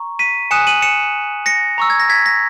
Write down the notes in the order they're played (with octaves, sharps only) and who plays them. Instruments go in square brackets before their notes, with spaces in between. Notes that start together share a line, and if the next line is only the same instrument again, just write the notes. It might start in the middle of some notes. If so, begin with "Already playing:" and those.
Already playing: [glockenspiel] A#5 C#6
B6 D#7
G#5 D#6 F#6 C#7 E7
D#7 F#7
C#7 E7
A#6 C#7
A#5 C#6 E6
G#6
A#6
G#6 B6
A#6